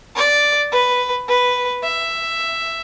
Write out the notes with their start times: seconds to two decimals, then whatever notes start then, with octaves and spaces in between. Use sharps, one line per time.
0.16 D5
0.72 B4
1.28 B4
1.83 E5